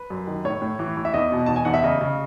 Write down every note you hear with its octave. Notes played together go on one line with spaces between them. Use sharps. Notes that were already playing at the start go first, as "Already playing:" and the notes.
Already playing: B4
F#2
D#3
A2 C#5
A2
E3
E3
E5
E2 D#5
B2
E2 A5
G#5
E2 F#5
E5
C#3 D#5
C#3